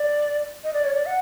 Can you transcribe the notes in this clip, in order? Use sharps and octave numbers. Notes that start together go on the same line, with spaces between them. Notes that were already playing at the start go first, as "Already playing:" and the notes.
Already playing: D5
D#5
D5
C#5
D5
F#5